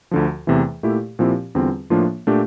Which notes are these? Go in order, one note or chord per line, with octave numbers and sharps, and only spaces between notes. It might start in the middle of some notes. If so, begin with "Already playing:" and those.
D2 D3 F3
E2 C3 E3 A3
A#2 A3 E4 G4
A#2 F3 C4 E4 G4
E2 D3 G3 C4 F4
A2 F3 A#3 D4 F4
A#2 A3 D4 G4